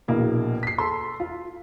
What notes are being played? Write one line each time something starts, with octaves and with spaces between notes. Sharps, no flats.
A#1 B2 A#3 E4
B6 C7
A4 C6
F4